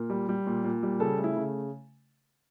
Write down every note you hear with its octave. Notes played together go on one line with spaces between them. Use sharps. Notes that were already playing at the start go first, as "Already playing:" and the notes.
Already playing: A#2 A#4
G3
G3
A#2
A#2
G3
C#3 A4
A3
E4
C#3